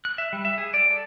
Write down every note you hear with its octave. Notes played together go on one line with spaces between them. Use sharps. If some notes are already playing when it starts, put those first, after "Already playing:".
F#6
E5
G3
E5
G#4
D5
A4